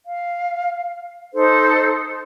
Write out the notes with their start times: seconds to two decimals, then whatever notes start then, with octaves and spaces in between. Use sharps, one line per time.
0.06 F5
1.33 D#4 A4 C5